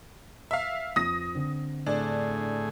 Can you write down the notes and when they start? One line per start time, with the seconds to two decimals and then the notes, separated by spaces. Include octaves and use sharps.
0.51 E5 F5
0.96 F2 D#6 A#6
1.35 D3 C4
1.86 A2 D4 G#4